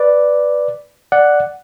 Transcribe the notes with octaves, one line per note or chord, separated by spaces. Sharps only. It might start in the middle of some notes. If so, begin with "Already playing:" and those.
Already playing: B4 D5
D5 F#5